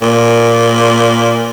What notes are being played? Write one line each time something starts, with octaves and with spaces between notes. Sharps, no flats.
A#2